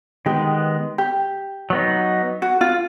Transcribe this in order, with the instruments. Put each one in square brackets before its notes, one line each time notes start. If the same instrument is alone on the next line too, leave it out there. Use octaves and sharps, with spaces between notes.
[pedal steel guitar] D#3 G#3 B3 [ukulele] G4
[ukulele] G4
[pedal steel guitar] F#3 B3 D#4
[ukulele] F#4
F4